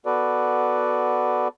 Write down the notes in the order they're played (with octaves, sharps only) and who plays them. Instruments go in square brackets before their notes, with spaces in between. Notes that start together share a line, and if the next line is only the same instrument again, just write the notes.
[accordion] B3 F#4 A4 B4 D5